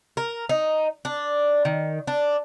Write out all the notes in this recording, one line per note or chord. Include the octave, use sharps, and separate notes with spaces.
A#4
D#4
D4
D#3
D4